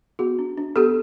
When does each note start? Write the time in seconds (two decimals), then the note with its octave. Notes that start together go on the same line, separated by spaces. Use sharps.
0.19 B3 F#4 G#4
0.39 D4
0.58 D4
0.76 B3 G4 A4